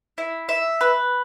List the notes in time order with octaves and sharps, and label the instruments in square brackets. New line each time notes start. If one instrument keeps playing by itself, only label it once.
[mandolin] E4
E5
B4